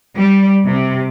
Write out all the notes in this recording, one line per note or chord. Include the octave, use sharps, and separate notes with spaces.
G3
C3